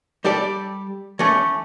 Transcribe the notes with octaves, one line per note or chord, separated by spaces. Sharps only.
G3 G4 A4 D5
E3 A3 C#4